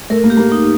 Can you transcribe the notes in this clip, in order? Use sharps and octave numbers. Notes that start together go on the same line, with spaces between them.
A3 A#4
A#3
G4
A#3
D#4